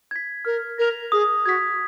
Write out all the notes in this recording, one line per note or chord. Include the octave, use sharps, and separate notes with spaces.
G#6 B6
A#4 F6
A#4 A#6 F7
G#4 D#6
F#4 G#6 B6